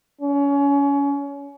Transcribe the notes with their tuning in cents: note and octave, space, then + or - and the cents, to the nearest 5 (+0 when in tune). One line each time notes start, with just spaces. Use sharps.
C#4 +25